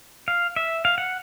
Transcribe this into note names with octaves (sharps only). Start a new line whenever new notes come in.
F5
E5
F5
F#5